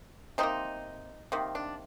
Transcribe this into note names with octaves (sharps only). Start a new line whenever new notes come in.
C3 F3 C4 D#4
A#3
C3 D#3 A#3
D4